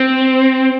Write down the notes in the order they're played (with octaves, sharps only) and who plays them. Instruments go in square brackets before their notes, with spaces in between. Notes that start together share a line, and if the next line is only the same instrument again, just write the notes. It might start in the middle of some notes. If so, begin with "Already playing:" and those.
Already playing: [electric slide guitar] C4